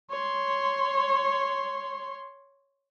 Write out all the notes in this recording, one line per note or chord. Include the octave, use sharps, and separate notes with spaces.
C#5 C6